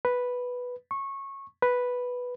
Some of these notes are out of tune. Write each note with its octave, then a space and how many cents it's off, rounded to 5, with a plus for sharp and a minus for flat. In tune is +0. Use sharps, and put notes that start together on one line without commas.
B4 +0
C#6 -20
B4 +0